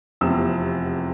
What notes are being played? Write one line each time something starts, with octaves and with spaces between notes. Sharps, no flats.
F1 E2 C3 F3 E6